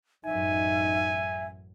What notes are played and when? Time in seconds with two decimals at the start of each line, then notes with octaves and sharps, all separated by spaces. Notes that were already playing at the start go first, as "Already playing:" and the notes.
0.25 A1 F#2 D#4 E5 G#5